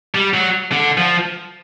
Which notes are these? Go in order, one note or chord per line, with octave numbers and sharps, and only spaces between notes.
G3
F#3
D3
F3